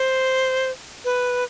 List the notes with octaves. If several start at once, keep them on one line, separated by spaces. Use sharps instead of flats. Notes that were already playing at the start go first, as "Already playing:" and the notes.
Already playing: C5
B4